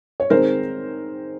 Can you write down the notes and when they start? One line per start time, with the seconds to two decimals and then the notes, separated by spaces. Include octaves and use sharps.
0.20 C#5
0.30 D#3 G#3 C4 A#4 C5